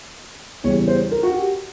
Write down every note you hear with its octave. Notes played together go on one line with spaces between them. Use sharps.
E2 C#3 E3 G3 C#5
C5
A#4
F#4
G4